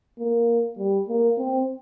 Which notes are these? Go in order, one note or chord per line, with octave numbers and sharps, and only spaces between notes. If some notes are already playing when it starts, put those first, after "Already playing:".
A#3
G3
A#3
C4